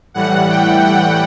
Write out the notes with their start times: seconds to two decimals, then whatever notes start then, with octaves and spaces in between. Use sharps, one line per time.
0.14 A2 E3 G3 F#5
0.50 G5
0.84 F#5